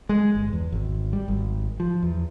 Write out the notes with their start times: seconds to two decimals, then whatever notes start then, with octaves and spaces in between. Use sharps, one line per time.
0.09 G#3
0.35 G1
0.53 E2
0.72 G#1
1.13 G3
1.28 G#1
1.80 F3
2.03 E2